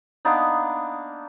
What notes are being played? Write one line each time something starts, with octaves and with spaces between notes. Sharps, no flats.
A#3 B3 D4 D#4